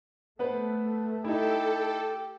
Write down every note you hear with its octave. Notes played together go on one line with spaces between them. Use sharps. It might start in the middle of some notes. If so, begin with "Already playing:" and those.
A3 B3 B4 C5
D#4 E4 G4 A4